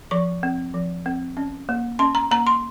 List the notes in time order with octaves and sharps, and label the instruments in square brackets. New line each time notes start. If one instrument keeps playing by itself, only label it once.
[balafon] F3 C#6
C4
F3
C4
C#4
A#3
C#4 C6
A#5
A#3 A#5
C6